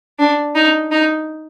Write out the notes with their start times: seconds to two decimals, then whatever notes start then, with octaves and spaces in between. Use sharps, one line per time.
0.19 D4
0.55 D#4
0.91 D#4